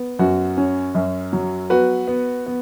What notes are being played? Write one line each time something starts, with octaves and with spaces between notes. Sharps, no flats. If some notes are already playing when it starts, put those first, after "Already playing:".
Already playing: B3
F#2 F#4
C#4
F#2
F#3
B3 F#4 B4
B3
B3